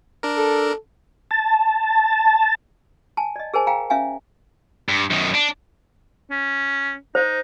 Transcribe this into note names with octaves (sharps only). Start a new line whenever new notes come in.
D4 A#4
A4
A5
G#5 A5
D5 D#5
G#4 A#4 C5 G#5 A5
F5 G5 G#5 A#5
C#4 E5 F5 G#5
G2
F#2 D#3
D4
C#4
D#4 C5